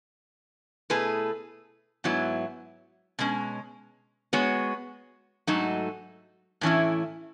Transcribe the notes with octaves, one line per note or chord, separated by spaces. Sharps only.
B2 A3 E4 G#4 B4
G#2 F#3 B3 E4
B2 G#3 C#4
G#3 B3 F#4 C#5
G#2 F#3 A3 D#4 F#4
A2 E3 A3 C#4 E4